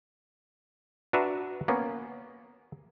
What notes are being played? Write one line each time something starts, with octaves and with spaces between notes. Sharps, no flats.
D4 F#4 B4 E5 A#5
A#3 B3 C#4